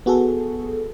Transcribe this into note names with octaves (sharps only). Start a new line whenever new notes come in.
B3 F#4 G#4 A4